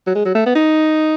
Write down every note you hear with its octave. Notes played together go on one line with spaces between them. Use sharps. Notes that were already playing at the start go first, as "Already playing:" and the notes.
F#3
G#3
F#3
A3
B3
D#4